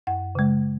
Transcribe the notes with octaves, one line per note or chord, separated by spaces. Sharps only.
F#2 F#5
C#3 G#3